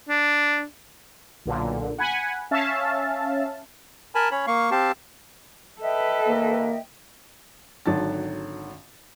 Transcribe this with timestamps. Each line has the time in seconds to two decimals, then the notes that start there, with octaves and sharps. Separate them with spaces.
0.09 D4
1.46 B1 A#2 D3
1.98 F#5 G#5 B5
2.51 C#4 E5 F5 A5
4.15 A#4 G#5 A5 B5
4.31 C#4 C#5 B5
4.47 A#3 F5 C#6
4.71 C4 G4 F5 A5
5.82 A4 B4 D#5 E5 G5
6.27 A#3
7.86 G#1 D3 D#3 F#3 A5 A6